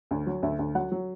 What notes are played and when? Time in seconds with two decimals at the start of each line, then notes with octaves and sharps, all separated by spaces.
0.11 D2
0.27 F#3
0.43 D2 E5
0.59 D2
0.75 F#3 F#5
0.92 F#3